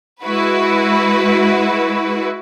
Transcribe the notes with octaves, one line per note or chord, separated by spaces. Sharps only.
G#3 E4 F#4 B4